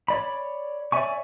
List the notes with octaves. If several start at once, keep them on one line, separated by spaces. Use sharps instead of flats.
C#5 D5 B5
C#5 D5 E5 G#5 C#6